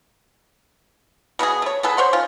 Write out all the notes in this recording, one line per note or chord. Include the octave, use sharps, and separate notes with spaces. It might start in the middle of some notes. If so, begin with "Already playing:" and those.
B2 B3 F#4 G#4
A3 C#5
B3 G#4 A4 B4
C5 C#5 F#5 C6
D#3 C#4 F4